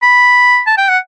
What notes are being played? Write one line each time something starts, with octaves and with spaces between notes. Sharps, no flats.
B5
A5
G5
F#5